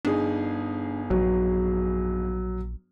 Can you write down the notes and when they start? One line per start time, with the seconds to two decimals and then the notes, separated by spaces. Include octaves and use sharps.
0.05 G1 D4 D#4 G#4
1.10 A#1 F#3